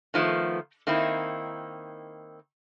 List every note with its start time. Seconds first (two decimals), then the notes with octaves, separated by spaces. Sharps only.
0.14 D#3 F3 A3 B3
0.87 D#3 A#3 C4 D#4 E4